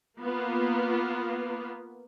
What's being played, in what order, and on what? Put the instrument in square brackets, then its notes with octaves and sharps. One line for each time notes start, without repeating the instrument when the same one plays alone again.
[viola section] A#3 B3 F4